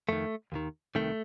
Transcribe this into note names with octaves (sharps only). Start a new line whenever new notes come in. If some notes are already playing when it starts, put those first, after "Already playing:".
F2 D#3 A3
D#2 D#3
C2 C3 D#3 A3